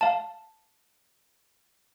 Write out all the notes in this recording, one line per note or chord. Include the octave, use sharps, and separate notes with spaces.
F5 A5